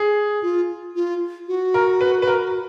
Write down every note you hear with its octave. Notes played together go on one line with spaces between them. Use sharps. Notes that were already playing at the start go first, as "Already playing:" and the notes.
Already playing: G#4
F4
F4
F#4
A#4
B4
B4
A#4